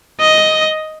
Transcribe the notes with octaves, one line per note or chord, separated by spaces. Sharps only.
D#5